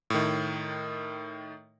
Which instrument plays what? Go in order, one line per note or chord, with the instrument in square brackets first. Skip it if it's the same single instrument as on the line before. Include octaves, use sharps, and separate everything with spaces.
[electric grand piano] A2 D#3